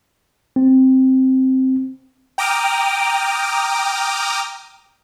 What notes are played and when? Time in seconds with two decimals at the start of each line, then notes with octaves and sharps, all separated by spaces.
0.56 C4
2.38 G5 A#5 D6 D#6 F6